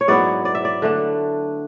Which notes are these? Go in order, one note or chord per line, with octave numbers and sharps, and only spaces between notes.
C#5
G#2 F#3 B3 E4 D5
D5
E5
D5
D3 A3 D4